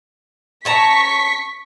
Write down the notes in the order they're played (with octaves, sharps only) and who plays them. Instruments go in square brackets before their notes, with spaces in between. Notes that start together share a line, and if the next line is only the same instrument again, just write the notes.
[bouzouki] C#4 A5 A#5 [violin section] C#6 B6